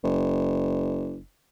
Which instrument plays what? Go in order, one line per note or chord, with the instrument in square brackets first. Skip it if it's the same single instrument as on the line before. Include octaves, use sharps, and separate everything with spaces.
[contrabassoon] F#1